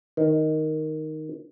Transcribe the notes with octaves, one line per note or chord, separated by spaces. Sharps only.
D#3